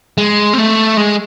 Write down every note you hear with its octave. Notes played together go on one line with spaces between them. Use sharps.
G#3
C4
A3
G#3